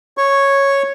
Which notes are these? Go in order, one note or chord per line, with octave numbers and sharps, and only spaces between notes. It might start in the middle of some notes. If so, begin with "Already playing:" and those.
C#5 C#6